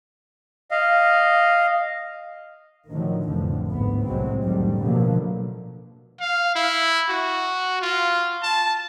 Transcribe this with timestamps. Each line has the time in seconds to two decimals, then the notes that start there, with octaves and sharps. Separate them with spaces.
0.71 D#5 F5
2.89 A2 D3 D#3 F3 F#3
3.26 C2 F2 A2 D3 E3 F3
3.68 G#1 D2 G#2 B3
4.06 C2 A2 C3 F#3 G#3 C4
4.44 F1 A2 D3 D#3 G3
4.83 B2 D3 F3 F#3 A3 A#3
6.20 F5
6.55 E4
7.10 F#4
7.82 F4
8.43 A5